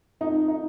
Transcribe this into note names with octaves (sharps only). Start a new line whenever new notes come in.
F2 D#4
D#4